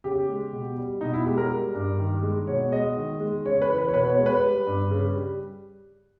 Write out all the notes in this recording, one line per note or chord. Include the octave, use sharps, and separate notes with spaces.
C#3 G4
G#3
B2
G3
B2 D#4
E4
G#3 G4
A#4
G3
G2
D#3
G#3
B2 C#5
G#3 D#5
D#3
G#3
C#3 C#5
B4
E3
B4
C#5
B2 B4
C#5
G#3
B4
G3
G2
C#3
G3